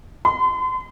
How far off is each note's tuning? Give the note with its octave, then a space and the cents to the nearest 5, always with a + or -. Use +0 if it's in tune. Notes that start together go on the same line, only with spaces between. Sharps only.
C6 -40